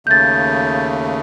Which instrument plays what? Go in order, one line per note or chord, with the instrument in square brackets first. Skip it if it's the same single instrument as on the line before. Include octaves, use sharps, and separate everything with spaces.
[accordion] D#2 C#3 A3 [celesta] G6 A6